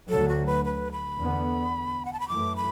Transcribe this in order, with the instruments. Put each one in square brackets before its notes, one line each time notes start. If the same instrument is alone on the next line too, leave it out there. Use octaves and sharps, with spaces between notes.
[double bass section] D2 D3 F#3 [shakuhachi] A4
[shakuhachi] F#4
B4
B4
B5
[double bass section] E2 D3 B3
[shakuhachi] F#5
A5
B5
[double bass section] F#2 E3 A3 [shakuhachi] D6
[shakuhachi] B5